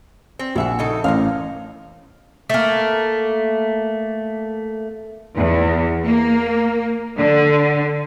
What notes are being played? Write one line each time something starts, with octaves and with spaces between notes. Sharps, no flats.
C4
A#1 C#3 E5 F#5
C#3 D#4 A4
A1 A#4 C5 F5
A3 A#3
E2
A#3
D3